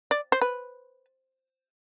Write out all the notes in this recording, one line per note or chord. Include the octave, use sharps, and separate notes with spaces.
D5
C5
B4